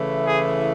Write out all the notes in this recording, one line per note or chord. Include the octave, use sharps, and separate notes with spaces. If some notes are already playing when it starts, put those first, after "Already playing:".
Already playing: C#3 E3 A3 E4
G#4